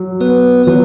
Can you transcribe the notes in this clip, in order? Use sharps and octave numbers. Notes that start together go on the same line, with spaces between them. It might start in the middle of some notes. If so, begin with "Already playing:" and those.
Already playing: F#3
B3 B4
F#3 B3 B4